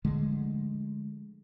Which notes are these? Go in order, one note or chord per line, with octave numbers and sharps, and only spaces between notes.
D3 F3 G#3 A3